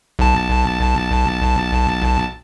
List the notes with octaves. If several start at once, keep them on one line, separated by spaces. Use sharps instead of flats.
B1 A5